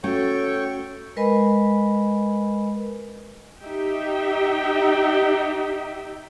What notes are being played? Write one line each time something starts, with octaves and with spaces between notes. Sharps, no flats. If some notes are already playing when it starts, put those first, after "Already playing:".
A3 C#4 F#4 A4 C#5 G5 C#6
G#3 A#4 B4 D#5 G#5 B5
D#4 G4 E5 G5